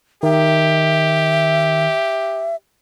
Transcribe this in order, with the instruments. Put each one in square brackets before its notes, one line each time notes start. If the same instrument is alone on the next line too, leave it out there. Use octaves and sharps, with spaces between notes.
[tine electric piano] D#3 [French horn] G4 [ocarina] E5